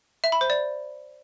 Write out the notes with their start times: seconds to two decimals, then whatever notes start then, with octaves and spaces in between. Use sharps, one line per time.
0.24 E5
0.32 B5
0.41 C5
0.50 D5